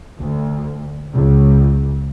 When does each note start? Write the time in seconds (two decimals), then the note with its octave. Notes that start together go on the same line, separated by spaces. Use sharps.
0.20 D2
1.12 C#2